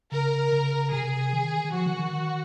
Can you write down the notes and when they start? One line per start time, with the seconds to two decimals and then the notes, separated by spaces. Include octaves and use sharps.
0.11 C#3 A#4
0.52 C#3
0.91 C3 G#4
1.33 D#3
1.64 D#3
1.73 F3 F#4
1.86 D#3
1.99 D#3
2.13 D#3